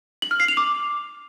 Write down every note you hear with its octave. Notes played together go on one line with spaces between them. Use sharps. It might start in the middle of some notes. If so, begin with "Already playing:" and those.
F#7
F6
C7
F7
D6